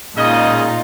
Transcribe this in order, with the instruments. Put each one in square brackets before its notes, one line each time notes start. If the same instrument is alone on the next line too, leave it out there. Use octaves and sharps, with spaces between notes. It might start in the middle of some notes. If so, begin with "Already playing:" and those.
[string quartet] A#2 D#4 F4 [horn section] C#3 G#3 D#5